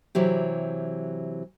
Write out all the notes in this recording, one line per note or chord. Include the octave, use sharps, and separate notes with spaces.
C3 E3 F#3 G4